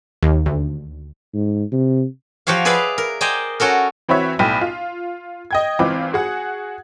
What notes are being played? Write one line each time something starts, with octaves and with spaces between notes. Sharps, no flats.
D#2
D2
G#2
C3
F3 F#4 G4 C#5 F5
G#4 B4 D5 E5 F5 B5
A#4
C5 D5 D#5 G5 G#5 A#5
C#4 F#4 A4 A#4
E3 C4 F#4 B4 C#5 E5
B1 A2 G5
F4
D#5 G5 G#6
G#1 E3 C4 F4 D6
F#4 G#4 F#5